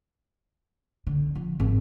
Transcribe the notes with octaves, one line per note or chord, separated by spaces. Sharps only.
D3
F3
G#1